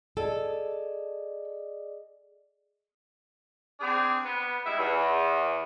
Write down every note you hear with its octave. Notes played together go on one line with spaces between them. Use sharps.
G#4 A4 D5 D#5
C4 D4 G#4
B3
G3 G#3 D#4 E4
E2